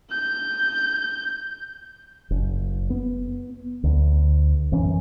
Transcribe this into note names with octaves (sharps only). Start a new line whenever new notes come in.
G6
F#1
B3
D2
G#1 F#2 E3 C#4